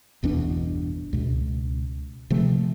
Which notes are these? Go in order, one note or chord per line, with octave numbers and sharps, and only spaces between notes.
G1 E2 B2 D4
C#2 B2
C3 F3 A3